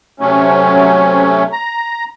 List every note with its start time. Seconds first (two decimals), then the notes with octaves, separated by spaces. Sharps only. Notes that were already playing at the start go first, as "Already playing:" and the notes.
0.20 C3 F#3 A3 C#4
1.52 A#5